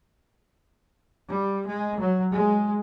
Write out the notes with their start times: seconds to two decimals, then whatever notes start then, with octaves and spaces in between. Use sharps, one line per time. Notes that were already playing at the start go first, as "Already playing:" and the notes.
1.28 G3
1.66 G#3
2.00 F#3
2.33 G#3